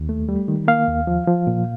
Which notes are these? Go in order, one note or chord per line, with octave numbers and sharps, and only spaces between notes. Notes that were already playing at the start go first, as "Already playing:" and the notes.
Already playing: D#2
A3
G3
D#3
A#3 F5
D#2
F3
F3
A#2